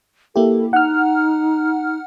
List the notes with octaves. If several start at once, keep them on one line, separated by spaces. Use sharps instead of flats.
A#3 E4 G4 A4
D#4 F#5 F6